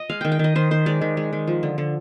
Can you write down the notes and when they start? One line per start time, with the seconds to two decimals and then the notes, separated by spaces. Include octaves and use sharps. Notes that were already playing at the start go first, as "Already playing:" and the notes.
Already playing: D#5
0.09 G#3 F5
0.21 D#3 G5
0.32 G5
0.39 D#3 D#5
0.55 D#3 C5
0.71 D#3 C5
0.86 G#3 D5
1.01 D#3
1.17 G#3
1.33 D#3
1.47 F3
1.63 D3
1.78 D3